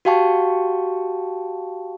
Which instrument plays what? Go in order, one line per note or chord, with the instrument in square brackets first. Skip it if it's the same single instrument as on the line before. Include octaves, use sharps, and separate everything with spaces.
[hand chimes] F#4 G4 F5 G5 A5 C#6